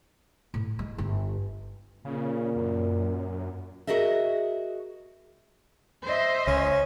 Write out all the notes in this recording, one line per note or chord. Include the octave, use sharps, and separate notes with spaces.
A2
G#3
G1
A#2 C#3
F#2
F#4 G#4 A#4 D#5 E5
C5 D#5 E5
C#2 C#4